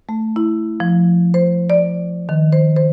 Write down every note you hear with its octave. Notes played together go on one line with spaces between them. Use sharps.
A3
E4
F3
C5
D5
D#3
C5
C5